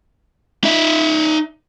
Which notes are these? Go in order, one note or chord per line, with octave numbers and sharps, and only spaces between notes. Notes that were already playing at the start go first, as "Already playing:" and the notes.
D#4 E5